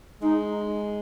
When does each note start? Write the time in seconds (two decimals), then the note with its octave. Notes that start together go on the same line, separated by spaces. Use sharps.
0.21 G#3 D#4